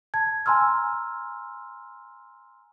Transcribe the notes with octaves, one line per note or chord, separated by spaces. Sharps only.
A5 G#6
G#5 A#5 C6 E6 F6